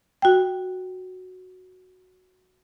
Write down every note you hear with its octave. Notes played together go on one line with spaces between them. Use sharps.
F#4 G5